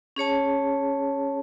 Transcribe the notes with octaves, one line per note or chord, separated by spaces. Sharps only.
C#4 G#4 C#5 A5